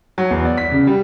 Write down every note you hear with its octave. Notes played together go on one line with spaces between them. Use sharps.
F#3
E2
D5
B6
C#3
G3